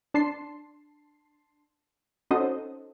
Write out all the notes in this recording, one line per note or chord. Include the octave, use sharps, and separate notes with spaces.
D4 A5 C6 C7
C#4 D#4 F#4 A4 C5 D#5